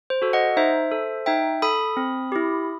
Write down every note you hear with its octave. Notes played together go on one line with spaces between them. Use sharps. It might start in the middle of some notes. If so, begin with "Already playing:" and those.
C5
F#4 A4
D#5 F#5
D#4 C5 E5
A4
D#4 E5 G5
A4 B5 D#6
C4
E4 G4